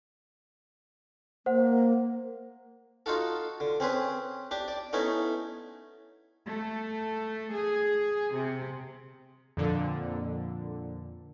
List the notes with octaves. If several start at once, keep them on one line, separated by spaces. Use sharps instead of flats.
A#3 C5 F#5
D#4 F4 F#4 A4
D3
C4 C#4 G#4 B4
D4 G4
D5
A3 B3 C#4 D#4 E4
A3
G#4
C3
F2 A#2 D3